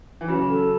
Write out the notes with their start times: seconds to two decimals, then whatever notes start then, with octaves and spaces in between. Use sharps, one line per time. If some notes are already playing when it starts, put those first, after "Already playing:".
0.21 E3
0.28 C#3 F#3 C#4
0.48 A4